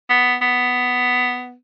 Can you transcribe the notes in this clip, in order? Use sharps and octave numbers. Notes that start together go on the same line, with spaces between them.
B3
B3